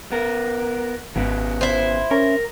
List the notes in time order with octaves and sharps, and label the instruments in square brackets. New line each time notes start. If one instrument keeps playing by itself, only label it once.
[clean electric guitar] B3 A#4
[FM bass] G#1 [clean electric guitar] C#3 B3
[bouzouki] E4 C5
[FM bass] C#4 [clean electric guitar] A#4